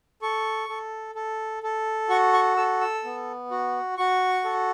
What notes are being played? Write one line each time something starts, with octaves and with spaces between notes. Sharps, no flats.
A4 C#6
A4
A4
A4
F#4 C#6
C#6
A4 E6
E6
B3
F#4
F#4 C#6
A4